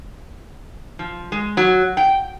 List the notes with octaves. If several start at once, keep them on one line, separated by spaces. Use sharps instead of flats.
F3
G#3
F#3
G5